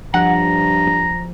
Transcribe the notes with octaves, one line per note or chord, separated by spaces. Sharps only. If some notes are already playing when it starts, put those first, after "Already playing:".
G2 F3 F#5 A#5